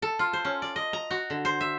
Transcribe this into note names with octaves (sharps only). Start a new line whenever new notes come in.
A4
F4
C5
C#4
D5
D#5
A#5
F#4
D3
C5
E5